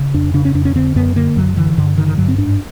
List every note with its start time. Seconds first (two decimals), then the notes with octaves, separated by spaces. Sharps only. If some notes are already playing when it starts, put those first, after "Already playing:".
Already playing: C#3
0.14 F2 D4
0.34 C#3 D4
0.45 C#4
0.55 F2 D4
0.65 C#4
0.76 D3 C4
0.96 F#2 B3
1.16 D3 A#3
1.36 F#2 F#3
1.57 D3 E3
1.77 G2 D3
1.97 D3 D#3
2.08 D#3
2.18 G2 F#3
2.28 C4
2.38 G#2 D4